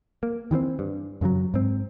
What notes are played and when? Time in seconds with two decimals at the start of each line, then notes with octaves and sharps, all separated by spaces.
0.23 A#3
0.51 D#3 E3 G3 C4
0.79 G2
1.21 F#2 C#3 F3 F#3
1.54 G#2 C4